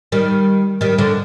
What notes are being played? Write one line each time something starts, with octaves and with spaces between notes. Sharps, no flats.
D#3 G3
D#3 G3
D3 F3